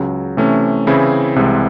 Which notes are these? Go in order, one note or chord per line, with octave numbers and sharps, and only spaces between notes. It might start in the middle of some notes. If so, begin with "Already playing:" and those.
Already playing: C#2 C#3 F#3
C3 E3 A3 C#4
C#3 E3 C4 E4 G#4
C2 C3 E3 G#3